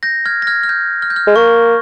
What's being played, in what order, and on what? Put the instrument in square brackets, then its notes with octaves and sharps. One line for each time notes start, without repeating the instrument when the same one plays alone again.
[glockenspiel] G6 A#6
F6 G#6
A#6
F6 G#6
F6
G6
F6
G6
F6
[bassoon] G#3
[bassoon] A#3 [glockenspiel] C#6